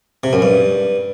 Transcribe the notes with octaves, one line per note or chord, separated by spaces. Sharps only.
C3
F#2
G2